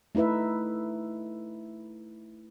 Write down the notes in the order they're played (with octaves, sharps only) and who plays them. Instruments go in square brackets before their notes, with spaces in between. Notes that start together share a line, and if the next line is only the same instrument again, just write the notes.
[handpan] A3 D#4 E4 B4 E5